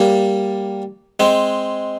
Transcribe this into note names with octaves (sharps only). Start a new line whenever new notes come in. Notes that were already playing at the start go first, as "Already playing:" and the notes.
Already playing: G3 A#3
G#3 C4